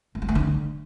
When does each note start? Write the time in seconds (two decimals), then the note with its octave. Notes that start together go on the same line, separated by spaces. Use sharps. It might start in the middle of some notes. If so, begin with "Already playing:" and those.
0.15 A3
0.22 G3
0.29 A3
0.35 D3